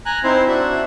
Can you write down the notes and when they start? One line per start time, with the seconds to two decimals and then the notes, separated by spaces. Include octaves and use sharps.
0.06 G#5 A#5 F#6
0.24 C4 D#4 E4 C5
0.48 D4 F#4 E5